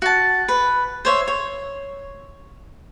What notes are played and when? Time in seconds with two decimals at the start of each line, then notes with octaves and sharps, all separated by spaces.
0.02 F#4 A5
0.48 B4
1.05 C5 C#5 E5
1.28 C#5